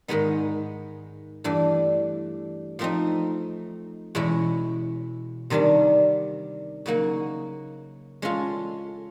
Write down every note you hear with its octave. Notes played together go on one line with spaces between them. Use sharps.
G#2 D#3 G#3 B3 D#4
G2 E3 A3 D4
F3 A3 C4 D#4
E2 B2 G#3 C#4 E4
C3 D#3 G3 B3 D4
C#3 F#3 A#3 D#4 F#4
G#3 C#4 F4 A4